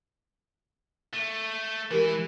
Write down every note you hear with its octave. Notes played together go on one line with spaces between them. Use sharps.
A3
E3 G#3 E4 G4 A#4